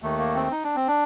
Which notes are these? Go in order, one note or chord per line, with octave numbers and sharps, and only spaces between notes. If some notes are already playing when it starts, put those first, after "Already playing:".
D#2 D#3 A3
A#3
C4
D#4
D4
C4
D4